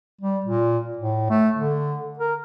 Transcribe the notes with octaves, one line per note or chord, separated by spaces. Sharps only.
G3
A#2
A2
A3
D3
A#4